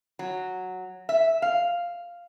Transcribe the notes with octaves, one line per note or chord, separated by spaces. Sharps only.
F#3
E5
F5